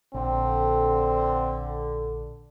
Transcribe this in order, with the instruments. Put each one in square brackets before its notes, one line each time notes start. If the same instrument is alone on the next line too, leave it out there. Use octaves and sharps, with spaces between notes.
[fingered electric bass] A#1 [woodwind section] D3 [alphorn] C4